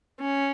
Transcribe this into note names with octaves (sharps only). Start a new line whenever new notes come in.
C#4